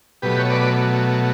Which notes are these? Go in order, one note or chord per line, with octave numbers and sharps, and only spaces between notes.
B2 F#3 A3 G4 B4
C#5
B4 D5